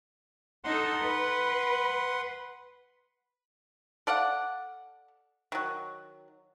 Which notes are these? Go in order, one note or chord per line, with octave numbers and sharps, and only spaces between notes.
D#4 A4 F#5 C6
B4
A4 D5 F5 F#5
D#3 F#3